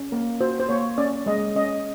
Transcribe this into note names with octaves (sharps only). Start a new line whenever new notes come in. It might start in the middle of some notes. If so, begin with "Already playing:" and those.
Already playing: C#4
A#3 A#4
F#4 C5
C5
A#3 C#5
C#4 D5
G#3 D#5
C#4 D#5